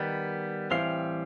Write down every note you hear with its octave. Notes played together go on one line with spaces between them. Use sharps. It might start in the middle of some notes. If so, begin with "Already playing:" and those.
Already playing: D#3 G3 B3
A2 E3 G3 C4 F5